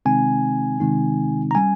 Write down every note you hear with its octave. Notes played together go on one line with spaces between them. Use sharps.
C3 D#3 G#3 C4 D#4 G#5
C3 D#3 G#3 C4 D#4
A#5
G3 C#4 G#5